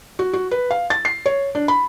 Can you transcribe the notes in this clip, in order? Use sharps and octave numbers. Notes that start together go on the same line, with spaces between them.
F#4
F#4
B4
F5
A6
C7
C#5
D4
B5